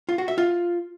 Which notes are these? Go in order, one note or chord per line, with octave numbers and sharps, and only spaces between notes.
F4
F#4
E5
F4